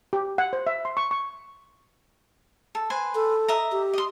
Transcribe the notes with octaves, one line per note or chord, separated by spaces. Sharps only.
G4
F#5
C5
E5
C6
C#6
C#6
A4
B4 C5 G#5
A4
D#5 E5 A#5
G4
D#5 C6